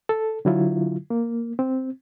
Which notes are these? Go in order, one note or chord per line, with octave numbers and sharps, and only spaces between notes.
A4
D3 F#3 E4 F4
A#3
C4